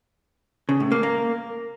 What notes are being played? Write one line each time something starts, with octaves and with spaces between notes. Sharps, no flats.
C#3
A2
A#3
A#3